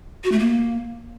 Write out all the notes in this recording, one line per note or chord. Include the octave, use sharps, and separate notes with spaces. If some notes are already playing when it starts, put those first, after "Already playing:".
F#4
A3
A#3